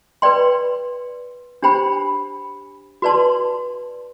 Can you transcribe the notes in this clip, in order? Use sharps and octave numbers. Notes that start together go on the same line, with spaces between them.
B4 D5 G5 C6
D4 G4 C5 G5 B5
F#4 B4 D5 A5 C6